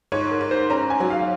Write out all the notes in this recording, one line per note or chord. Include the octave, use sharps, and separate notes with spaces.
G#2 C#5
A#4
G#2
C5
C#4 A#5
G#5
F#3
F5